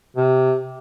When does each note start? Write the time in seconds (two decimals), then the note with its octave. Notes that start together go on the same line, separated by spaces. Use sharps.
0.16 C3